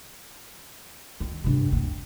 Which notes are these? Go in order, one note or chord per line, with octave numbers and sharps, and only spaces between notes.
D#3
G2 C3
B3 C4